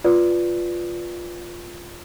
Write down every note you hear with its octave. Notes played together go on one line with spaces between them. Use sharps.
F4 B4 D5